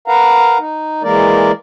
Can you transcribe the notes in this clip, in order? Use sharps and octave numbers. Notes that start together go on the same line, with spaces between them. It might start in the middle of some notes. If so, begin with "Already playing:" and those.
A#4 B4 F5 F#5 A#5
D#4
E3 G#3 A#3 A#4 D5